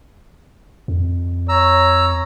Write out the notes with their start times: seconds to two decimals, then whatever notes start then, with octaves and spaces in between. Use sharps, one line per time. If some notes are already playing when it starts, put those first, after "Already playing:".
0.88 F2
1.49 C#5 A#5 E6